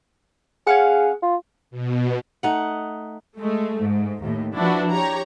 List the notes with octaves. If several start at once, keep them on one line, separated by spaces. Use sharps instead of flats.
C#4 G#4 F5 F#5
F4
B2
A3 D#4 F#5
G#3 A3
G#2
D#2 A2
F3 D4 E4 F#4 B4
G4 C#5 A#5